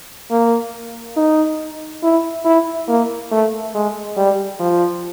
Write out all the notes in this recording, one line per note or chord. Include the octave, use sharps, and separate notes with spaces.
A#3
D#4
E4
E4
A#3
A3
G#3
G3
F3